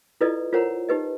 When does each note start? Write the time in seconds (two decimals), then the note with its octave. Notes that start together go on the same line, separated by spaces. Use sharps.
0.21 E4 F4 A4 B4 D5 D#5
0.53 F4 A#4 C5 C#5 F#5 A#5
0.89 D#4 G4 B4 D#5